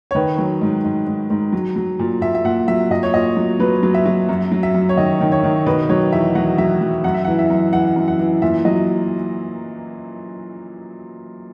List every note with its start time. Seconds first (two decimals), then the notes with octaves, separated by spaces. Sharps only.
0.11 C#5
0.15 D#3 B4
0.38 F#3
0.61 G#2
0.84 G#2
1.07 G#2
1.30 G#2
1.52 F#3
1.76 F#3
1.99 A#2
2.21 A#2 E5
2.35 E5
2.44 A#2 F#5
2.68 F#3 E5
2.90 A#2 D#5
3.03 C#5
3.14 A#2 D#5
3.37 F#3
3.60 F#3 B4
3.83 F#3
3.94 E5
4.06 F#3
4.29 F#2
4.52 F#3
4.63 E5
4.74 F#2
4.89 C#5
4.97 D#3 D#5
5.21 D#3
5.32 C#5
5.44 D#3
5.66 B2 B4
5.89 F#3 C#5
6.12 E2 E5
6.35 F#3 F#5
6.58 F#3 E5
6.81 F#3 E5
7.04 F#2 F#5
7.14 E5
7.24 F#5
7.27 E3
7.39 E5
7.50 F#2
7.73 E3 F#5
7.96 F#2
8.08 F#5
8.19 E3
8.42 A#2 E5
8.65 F#3 D#5